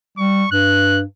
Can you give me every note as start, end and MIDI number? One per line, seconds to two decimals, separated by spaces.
0.18 0.44 55
0.18 0.49 85
0.52 1.02 43
0.52 1.00 90